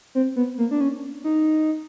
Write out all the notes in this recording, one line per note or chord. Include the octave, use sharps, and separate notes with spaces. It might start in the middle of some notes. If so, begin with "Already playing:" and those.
C4
B3
A#3
D4
C#4
D#4